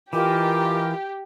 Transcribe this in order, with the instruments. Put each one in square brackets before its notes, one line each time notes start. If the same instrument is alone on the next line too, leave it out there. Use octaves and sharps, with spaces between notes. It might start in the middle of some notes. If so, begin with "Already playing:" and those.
[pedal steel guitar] E3 [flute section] F4 A#4 D#5 [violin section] G4 [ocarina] D6